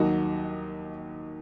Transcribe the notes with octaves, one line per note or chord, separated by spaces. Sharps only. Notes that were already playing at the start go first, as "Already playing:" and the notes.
Already playing: D#2 D#3 F#3 D#4 F#4